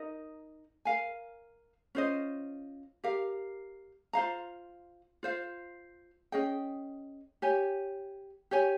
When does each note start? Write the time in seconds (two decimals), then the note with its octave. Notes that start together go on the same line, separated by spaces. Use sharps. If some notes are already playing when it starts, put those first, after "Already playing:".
Already playing: D#4 A#4 D#5
0.85 A#4 F5 G#5
1.95 C#4 F4 C5 D#5
3.04 G4 A#4 F5
4.13 F4 C5 F5 A#5
5.23 F4 C5 F5
6.32 C#4 G#4 D#5 G5
7.42 G4 C#5 G#5
8.51 G4 C#5 G#5